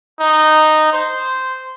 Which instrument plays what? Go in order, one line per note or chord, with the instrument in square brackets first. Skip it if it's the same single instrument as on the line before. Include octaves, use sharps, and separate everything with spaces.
[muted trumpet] D#4
C5